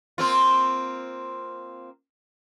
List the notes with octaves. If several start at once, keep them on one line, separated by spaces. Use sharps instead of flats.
A#3 C4 F4